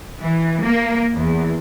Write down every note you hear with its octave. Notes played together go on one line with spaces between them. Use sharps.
E3
A#3
E2